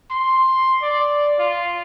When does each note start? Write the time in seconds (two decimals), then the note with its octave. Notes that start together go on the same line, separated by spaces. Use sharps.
0.11 C6
0.82 D5
1.39 F4